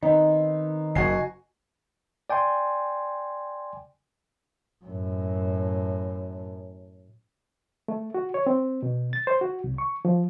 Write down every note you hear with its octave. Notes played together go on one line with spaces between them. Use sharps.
D#3 B3 C4 D#4
F#1 F#4 G#5 C7
D5 G5 G#5 C6
F#2 A2
A3
F#4
C#5
C4
B2
A6
C5
F#4
C2
C#6
F3